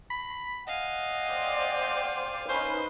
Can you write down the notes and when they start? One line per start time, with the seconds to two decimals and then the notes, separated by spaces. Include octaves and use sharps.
0.11 B5
0.67 D#5 F5 F#5 G#5
1.26 C5 D5 G5
2.49 C#4 D#4 B4 C5